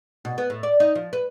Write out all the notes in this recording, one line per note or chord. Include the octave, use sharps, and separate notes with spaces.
B2
B3
A2
D5
D#4
F3
B4